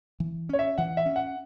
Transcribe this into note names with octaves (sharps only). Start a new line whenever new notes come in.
E3
C#4 C#5
E5
E3 F#5
E5
C#4
F#5